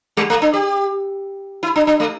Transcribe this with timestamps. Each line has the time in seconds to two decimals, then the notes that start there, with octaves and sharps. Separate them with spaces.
0.17 G3
0.30 A3
0.42 D4
0.54 G4
1.63 E4
1.76 D4
1.87 D4
2.00 A3